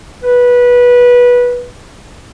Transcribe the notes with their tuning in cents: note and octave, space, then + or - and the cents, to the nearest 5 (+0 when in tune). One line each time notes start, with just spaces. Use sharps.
B4 -15